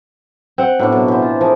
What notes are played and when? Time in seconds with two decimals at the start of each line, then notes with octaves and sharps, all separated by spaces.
0.58 C4 F#5
0.79 A2 F#3 B3 D4
0.92 B2 F#3 A4
1.08 E3 C5
1.22 F4
1.41 F3 G#4 A#4